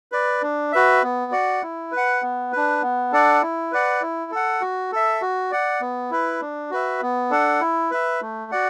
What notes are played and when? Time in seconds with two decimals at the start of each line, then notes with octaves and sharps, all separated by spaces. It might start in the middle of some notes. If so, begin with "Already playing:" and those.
0.12 B4 D5
0.42 D4
0.72 F#4 B4 E5
1.03 B3
1.32 F#4 D5 F#5
1.63 E4
1.92 B4
1.97 F#5
2.22 B3
2.52 D4 B4
2.82 B3
3.12 D4 A4 D5 F#5
3.42 E4
3.72 B4 D5 F#5
4.02 E4
4.31 A4 F#5
4.61 F#4
4.92 A4 E5
5.22 F#4
5.51 D5 F#5
5.81 B3
6.11 E4 B4
6.41 D4
6.71 F#4 B4 E5
7.02 B3
7.31 D4 A4 F#5
7.61 E4
7.91 B4 E5
8.21 A3
8.52 F#4 D5 F#5